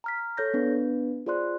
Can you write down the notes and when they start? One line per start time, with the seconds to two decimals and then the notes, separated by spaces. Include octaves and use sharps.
0.04 A#5 F6 B6
0.37 A4 C#5 G6 A#6
0.54 B3 D4 B4
1.26 F4 G#4 C5 D5 C6 F#6